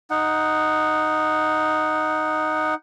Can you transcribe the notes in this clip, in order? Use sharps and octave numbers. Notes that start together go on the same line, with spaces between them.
D#4 F#5